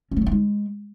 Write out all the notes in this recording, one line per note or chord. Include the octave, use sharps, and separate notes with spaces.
C#4
A3
F#3
D#4
G#3